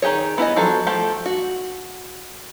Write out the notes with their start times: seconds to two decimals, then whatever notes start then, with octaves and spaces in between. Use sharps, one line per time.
0.02 D#3 G4 G#4 C#5
0.38 B3 E4 G#4 D#5
0.56 F3 F#3 A4
0.86 F3 A3 G4 A4
1.26 F#4